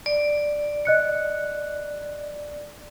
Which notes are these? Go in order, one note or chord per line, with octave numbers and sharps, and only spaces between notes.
D5
D#5 F#6 C#7